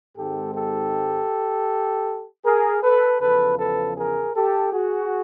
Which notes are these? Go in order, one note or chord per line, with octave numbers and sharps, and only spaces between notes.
G#2 D#3 G#3 C4 G4 A4
G4 A4
G#4 A#4
A4 B4
E2 C#3 F3 A4 B4
A4 B4
G#4 A#4
G4 A4
F#4 G#4